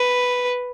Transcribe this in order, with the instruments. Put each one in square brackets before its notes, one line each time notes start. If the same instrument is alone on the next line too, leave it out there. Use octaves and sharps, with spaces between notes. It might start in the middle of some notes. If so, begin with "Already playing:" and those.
Already playing: [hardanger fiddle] B4